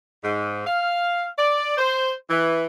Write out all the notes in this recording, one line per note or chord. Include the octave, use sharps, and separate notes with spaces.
G#2
F5
D5
C5
E3